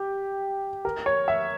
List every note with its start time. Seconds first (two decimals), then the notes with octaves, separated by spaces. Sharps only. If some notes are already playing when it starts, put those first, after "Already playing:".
Already playing: G4
0.85 A#4
1.06 C#5
1.28 E5